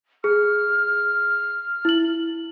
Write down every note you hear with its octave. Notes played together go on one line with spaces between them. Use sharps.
G#4 F6
E4 F#7